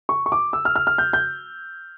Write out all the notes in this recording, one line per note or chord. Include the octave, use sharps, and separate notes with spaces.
C#6
C#6
D6
E6
F6
F6
F6
G6
G6